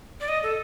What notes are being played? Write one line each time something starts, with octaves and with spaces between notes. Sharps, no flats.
D5
D#5
A4